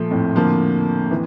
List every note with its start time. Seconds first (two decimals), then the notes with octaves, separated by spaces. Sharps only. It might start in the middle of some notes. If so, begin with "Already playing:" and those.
Already playing: A#2 F3 A3
0.10 F2 A2
0.36 D3 F3 A#3
1.11 E3